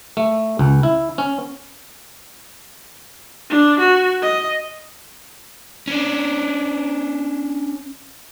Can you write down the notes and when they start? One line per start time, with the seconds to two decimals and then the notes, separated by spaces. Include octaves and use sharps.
0.17 A3
0.59 C#2
0.83 E4
1.18 C#4
3.50 D4
3.80 F#4
4.22 D#5
5.87 C#4 D4